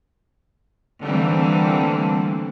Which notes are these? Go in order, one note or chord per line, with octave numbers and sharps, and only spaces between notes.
D3 E3 G3 A3 A#3 C4